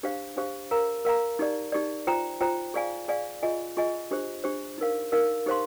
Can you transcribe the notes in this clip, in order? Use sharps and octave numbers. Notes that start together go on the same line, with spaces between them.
D4 G4 C5 F5
D4 G4 C5 F5
A#4 F5 A#5
A#4 F5 A#5
D#4 G4 D5
D#4 G4 D5
F4 C5 G5 A#5
F4 C5 G5 A#5
G#4 D5 F5 G#5
G#4 D5 F5 G#5
F4 G#4 D#5 G#5
F4 G#4 D#5 G#5
D4 G4 C5
D4 G4 C5
D#4 A#4 F5
D#4 A#4 F5
D#4 G4 C5 F5 C6